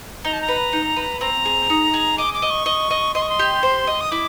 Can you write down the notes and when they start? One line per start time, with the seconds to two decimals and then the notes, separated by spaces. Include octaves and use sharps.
0.25 D#4 A#5
0.33 A5
0.42 A#5
0.48 B4
0.73 D#4
0.97 B4
1.21 C4 A#5
1.46 G#4
1.70 D#4
1.94 G#4
2.18 D#5 D6
2.34 D6
2.42 D#5
2.50 C#6
2.66 D#5
2.91 D#5
3.15 D#5 C6
3.22 C#6
3.29 C6
3.39 G4
3.63 C5
3.87 D#5
4.01 D#6
4.11 E4 D6